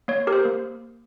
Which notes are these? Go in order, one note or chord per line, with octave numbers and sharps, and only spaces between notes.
A#3 C#5
G4 A#4
C5
A#3